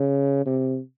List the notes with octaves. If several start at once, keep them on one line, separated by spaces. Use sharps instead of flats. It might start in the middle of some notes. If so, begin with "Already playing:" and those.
Already playing: C#3
C3